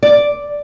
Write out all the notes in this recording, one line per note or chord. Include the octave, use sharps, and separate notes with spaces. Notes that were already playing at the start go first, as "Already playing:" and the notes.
D5